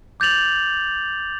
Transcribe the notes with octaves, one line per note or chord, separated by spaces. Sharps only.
D6 G6 A6 F7 F#7